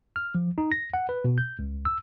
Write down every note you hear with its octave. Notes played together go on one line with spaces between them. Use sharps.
F6
F3
D#4
A#6
F#5
B4
B2
G6
C#2
E6